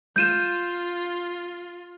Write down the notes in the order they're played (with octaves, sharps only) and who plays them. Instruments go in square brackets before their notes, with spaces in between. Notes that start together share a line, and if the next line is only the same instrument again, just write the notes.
[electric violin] F4 [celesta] G6 D#7 E7